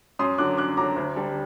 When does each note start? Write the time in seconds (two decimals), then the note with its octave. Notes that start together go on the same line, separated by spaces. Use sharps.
0.19 F#2 C6 D#6
0.38 D3 F#3 D6 F#6
0.57 F#2 D6 F#6
0.77 D3 F#3 A#5 D6
0.96 D2
1.16 D3 G3